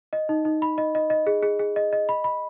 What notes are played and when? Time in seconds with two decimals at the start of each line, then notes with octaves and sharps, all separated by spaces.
0.13 D#5
0.29 D#4
0.45 D#4
0.62 B5
0.78 D#5
0.95 D#5
1.10 D#5
1.27 G#4
1.43 G#4
1.59 G#4
1.76 D#5
1.93 D#5
2.09 B5
2.24 B5